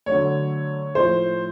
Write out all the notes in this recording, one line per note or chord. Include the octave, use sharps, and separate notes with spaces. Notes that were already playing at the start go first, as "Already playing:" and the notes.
D3 F#3 A3 C#5
A2 F3 A3 C5